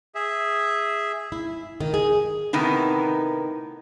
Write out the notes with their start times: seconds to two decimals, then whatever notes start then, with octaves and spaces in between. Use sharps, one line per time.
0.15 G#4 E5
1.32 E4
1.80 D#3
1.94 G#4
2.53 A2 C3 D#3 B3 D#4